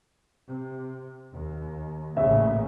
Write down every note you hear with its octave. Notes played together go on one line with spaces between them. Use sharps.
C3
D#2
A1 A#2 C#3 E5